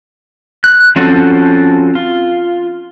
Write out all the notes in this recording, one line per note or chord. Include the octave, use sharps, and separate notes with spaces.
F#6
F3 C4 C#4 F#4 A4
F4